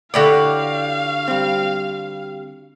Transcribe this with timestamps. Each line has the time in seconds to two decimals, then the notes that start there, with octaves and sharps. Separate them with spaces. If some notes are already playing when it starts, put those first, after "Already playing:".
0.14 D3 E4 F#4 G4 C#5 D5 F5
1.28 G3 C4